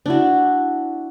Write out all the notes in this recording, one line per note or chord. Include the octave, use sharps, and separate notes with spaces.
D4 E4 F#4